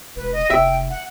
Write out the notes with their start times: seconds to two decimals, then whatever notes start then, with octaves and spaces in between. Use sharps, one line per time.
0.16 E1 B4
0.32 D#5
0.50 F1 E5 G5
0.90 F#5